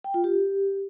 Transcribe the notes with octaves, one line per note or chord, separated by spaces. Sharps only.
G5
F4
G4